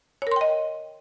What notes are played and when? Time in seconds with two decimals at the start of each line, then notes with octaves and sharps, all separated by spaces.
0.22 C#5
0.27 A#4
0.31 C6
0.36 G5
0.41 D#5